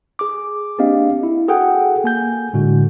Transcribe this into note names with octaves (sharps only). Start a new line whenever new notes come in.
G#4 D6
A#3 C4 D4 G4 D#5 F5
E4
F#4 G#4 A4 F#5 G5
A#3 G#5 G6
A2 D3 G#3 F#4